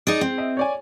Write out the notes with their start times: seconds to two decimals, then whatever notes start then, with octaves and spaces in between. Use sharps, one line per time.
0.07 D#4 G#4 D5
0.21 C4
0.38 D#5 E5
0.57 C#5 D5 G#5